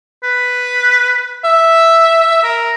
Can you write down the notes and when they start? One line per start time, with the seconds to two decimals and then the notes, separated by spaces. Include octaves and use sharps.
0.24 B4
1.45 E5
2.44 A#4